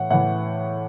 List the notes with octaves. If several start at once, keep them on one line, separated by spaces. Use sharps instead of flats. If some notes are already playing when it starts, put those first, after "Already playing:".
Already playing: A2 E3 F#5
A2 E3 F#5